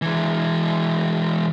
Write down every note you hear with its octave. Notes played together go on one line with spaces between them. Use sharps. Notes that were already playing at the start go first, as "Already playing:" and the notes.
E3 G#3